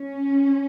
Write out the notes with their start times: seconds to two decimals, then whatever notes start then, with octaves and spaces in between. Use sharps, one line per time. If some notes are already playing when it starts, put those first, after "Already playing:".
Already playing: C#4